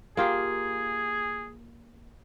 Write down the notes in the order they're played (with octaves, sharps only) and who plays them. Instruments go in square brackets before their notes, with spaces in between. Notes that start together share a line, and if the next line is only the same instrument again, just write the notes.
[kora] A#3 F4 G4 [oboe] G#4